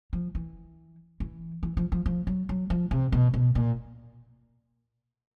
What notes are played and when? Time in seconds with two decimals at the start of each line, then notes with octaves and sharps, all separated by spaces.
0.13 F3
0.35 E3
1.20 E3
1.63 E3
1.77 F3
1.92 F3
2.06 F3
2.27 F#3
2.49 F#3
2.70 F3
2.91 C3
3.12 B2
3.34 B2
3.55 A#2